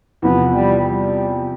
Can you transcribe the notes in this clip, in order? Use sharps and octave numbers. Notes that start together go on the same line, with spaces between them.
E2 C3 F3 B3
G3
G3